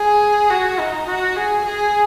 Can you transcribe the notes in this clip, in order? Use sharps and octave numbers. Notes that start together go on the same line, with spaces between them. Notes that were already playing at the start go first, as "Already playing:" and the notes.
Already playing: G#4
F#4
D#4
F#4
G#4
G#4